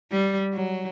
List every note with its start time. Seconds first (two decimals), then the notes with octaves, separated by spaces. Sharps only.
0.11 G3
0.53 F#3